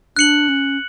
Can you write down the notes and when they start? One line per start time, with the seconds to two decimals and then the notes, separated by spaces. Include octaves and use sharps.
0.16 D4 F#6 C#7 F#7
0.49 C#4